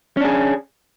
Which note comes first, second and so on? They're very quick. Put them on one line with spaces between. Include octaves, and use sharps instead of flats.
C#4 D4 G#4